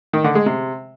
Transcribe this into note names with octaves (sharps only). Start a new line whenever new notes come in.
D#3
D3
G#3
C3